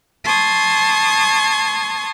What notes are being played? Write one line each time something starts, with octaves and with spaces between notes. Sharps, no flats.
A5 C6 C#6 D#6 G#6